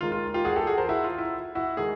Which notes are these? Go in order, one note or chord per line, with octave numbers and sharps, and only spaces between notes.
D#2 D#3 G#3 F4
F4
F4 G4
F#4 G#4
G4 A4
F#4 G#4
A#4 C5
E4 F#4
F4
E4
E4 F#4
D#3 G#3 F#4 G#4